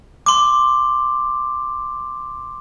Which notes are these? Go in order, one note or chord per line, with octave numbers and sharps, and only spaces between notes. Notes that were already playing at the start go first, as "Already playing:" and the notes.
C6 D6